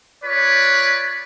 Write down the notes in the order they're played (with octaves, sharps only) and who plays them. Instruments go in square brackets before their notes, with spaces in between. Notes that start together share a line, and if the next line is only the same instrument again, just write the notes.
[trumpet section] F4 B4 C#5 D5